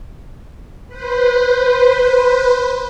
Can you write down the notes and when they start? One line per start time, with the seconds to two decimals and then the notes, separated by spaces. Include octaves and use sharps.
0.88 B4 C5